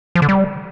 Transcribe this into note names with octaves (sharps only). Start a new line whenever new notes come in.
F3
D3
G3